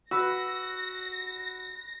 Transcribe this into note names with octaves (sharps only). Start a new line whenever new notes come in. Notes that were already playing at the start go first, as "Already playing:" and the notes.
F#4 B4 E6 A#6